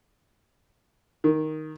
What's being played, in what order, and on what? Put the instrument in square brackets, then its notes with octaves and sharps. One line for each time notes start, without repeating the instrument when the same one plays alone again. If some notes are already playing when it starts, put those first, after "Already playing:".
[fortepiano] D#3